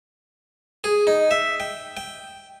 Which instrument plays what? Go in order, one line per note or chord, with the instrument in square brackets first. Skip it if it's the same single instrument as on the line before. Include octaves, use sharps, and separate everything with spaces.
[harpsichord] G#4
D#4
E5
G5
G5